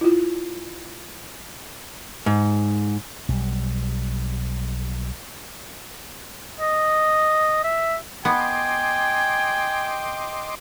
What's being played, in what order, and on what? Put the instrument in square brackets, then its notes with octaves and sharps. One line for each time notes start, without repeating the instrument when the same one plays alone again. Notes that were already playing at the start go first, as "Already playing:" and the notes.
[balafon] E4 F4
[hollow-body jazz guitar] G#2
[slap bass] B1 G3
[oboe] D#5
E5
[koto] B3 [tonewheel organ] D#5 C6 D6 [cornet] G5 [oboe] G#5